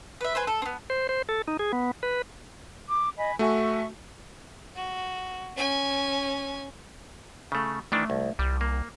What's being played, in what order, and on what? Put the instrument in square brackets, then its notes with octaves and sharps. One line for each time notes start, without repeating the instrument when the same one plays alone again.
[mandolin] B4 E5
G#4 B4 C5
A4
B3 C4
[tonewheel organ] C5
C5
A4
D#4
G#4
B3
B4
[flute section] D6
D#5 G#5 B5
[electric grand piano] A3 F#4 G#5 [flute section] E5 C#6
[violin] F#4
C#4 G#5
[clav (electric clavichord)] C#3 A3
[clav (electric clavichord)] D#3 E3 D4 [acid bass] A3
[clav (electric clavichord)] C2
[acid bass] C2 [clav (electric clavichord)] G3
[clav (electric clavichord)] A#3